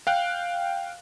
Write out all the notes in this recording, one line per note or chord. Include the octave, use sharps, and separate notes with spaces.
F5 G5 F#6